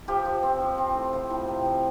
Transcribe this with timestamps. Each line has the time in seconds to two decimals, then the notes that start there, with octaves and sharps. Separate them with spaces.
0.08 F3 G4
0.25 F3
0.43 C4
0.60 F3
0.78 C4
0.95 A2
1.13 F3
1.30 A2
1.48 C3
1.65 F3